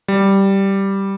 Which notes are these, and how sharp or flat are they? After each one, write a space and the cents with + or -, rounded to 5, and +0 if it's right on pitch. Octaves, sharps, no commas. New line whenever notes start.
G3 -5